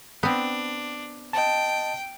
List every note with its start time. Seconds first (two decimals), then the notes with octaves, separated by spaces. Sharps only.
0.23 B3 C4 D4
1.33 D#5 G5 A5